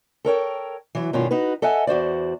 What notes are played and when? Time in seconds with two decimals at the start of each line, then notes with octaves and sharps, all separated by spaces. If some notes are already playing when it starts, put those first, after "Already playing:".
0.25 A4 A#4 C#5 G5
0.95 E3 F#3
1.13 G2 B2 D#3 A3 C#4 F4
1.31 D#4 F#4 B4
1.62 A4 D#5 E5 F#5 G#5
1.87 E2 F#4 C5 D5